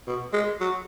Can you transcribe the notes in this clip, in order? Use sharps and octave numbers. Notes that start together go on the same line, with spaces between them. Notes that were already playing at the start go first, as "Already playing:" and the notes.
B2
G#3
F#3